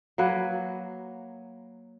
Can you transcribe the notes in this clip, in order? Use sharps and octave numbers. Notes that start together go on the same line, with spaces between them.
F#3 A#3 B4